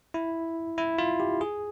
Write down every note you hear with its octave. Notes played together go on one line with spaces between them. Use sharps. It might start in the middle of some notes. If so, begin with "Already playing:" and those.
E4
E4
F4
G4
G#4